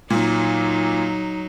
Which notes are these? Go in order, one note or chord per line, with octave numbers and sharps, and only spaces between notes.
A#2 F#3 D#4